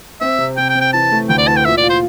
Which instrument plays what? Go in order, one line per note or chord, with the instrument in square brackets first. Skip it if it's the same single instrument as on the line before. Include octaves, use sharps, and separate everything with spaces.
[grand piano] C4 [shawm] E5
[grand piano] C3
[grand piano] C3 [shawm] G5
[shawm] G5
[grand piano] C3
[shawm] G5
[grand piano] E3 [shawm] A5
[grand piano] A3
[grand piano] D2 [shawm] G5
[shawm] D5
[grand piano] E3 [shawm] A5
[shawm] G5
[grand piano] A#2 [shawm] E5
[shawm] D5
[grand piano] F4
[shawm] C5